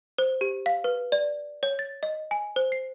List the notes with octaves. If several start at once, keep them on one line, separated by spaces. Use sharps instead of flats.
C5
G4
F5
B4
D5
C#5
A6
D#5
G#5
C5
C7